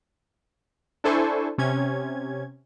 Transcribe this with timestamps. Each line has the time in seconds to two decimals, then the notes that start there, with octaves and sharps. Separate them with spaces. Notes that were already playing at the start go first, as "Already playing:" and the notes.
1.04 D4 E4 A4 C5 G#5 C#6
1.58 C3 C#4 G#6